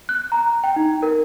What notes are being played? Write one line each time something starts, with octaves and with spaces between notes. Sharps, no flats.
F#6
A#5
G5
D#4
A#4